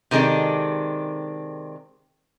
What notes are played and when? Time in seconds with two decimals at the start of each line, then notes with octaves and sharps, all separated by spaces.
0.11 C3 D#3 G#3 D4 A4